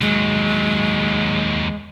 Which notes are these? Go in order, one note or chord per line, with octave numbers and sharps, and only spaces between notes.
D#2 F#3 G#3